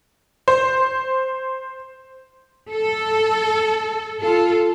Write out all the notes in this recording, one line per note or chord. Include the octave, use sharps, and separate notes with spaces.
C5
A4
F4 A4